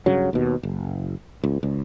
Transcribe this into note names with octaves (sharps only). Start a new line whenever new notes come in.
G2 C#3 F#3
D#2 B2
F#1
C#2
C#2